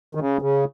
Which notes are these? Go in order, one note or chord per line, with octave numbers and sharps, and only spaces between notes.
D#3
C#3
C#3